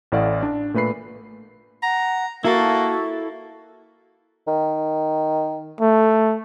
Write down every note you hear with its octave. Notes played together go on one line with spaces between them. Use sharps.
A1 A2 D5 F5 F#5
D4
A#2 A3 B4 B5 C7
F#5 A#5
A#3 E4 F#4 A4 A5
D#3
A3